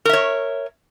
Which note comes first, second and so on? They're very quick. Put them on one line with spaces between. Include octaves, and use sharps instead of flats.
A#4 E5 C#5